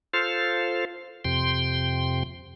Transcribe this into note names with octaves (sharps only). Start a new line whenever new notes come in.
F4 A4 C5 F5
F2 C3 G5 C6